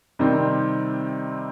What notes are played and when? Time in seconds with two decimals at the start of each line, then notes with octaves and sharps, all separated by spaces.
0.19 C3 D#3 G3 C4